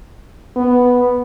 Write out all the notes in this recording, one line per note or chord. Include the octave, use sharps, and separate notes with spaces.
B3